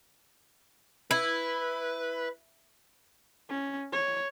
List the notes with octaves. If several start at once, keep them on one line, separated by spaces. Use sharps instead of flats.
E4 B4
C#4
C#5